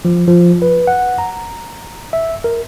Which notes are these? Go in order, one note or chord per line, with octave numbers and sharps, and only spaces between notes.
F3
F3
B4
F#5
A#5
E5
A#4